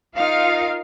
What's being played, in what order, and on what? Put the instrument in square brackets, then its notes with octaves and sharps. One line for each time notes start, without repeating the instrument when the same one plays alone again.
[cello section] D#4 F4 A#4 F5